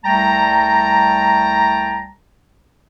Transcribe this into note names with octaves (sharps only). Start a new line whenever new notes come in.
C2 G3 A3 G5 A5 A#5